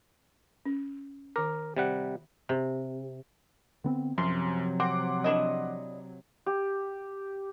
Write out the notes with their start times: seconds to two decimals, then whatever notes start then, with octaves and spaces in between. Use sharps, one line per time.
0.65 C#4
1.36 D#3 A#4 D6
1.77 C3 G3 F#5
2.49 C3
3.84 D3 B3 C4
4.18 F#2 C3 F3 F#3 C6
4.80 C4 F#5 C6 D6
5.24 D4 E4 D#5
6.46 G4